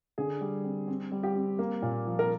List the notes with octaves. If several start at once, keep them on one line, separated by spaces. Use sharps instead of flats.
D3 G#4
G3
C4
C4
G3
G4
C4
A#3
A#2
F3
A#4